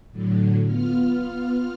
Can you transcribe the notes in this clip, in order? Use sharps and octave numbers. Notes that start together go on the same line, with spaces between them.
A2 D3 F#3
B3 F4 F6